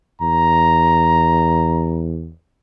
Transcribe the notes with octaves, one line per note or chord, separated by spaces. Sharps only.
E2 A#5